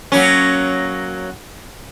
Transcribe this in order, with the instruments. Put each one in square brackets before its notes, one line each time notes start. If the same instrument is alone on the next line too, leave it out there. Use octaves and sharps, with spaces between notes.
[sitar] F#3 A#3 C#4